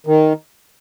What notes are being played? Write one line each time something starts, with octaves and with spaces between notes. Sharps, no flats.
D#3